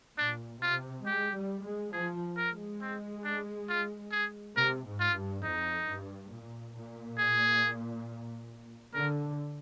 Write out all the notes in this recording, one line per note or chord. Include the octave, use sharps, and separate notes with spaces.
A#2 D4
C3 F4
G#3 G4
G3
G#3
F3 G#4
A#4
G#3
C4
D4
F4
G#4
C3 A#4
G#2
F4
G2
F2 D#4
G2
A#2
A#2
G#4
D3 A#4